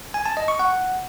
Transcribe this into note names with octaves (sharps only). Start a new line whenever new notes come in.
G#5
A5
D#5
C#6
F#5